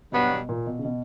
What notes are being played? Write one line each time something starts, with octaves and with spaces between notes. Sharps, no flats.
G2 B2 F#3 B3 D4 F#4
B2
A#2
B2
C#3
B2